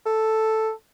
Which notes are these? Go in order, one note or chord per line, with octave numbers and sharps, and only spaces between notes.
A4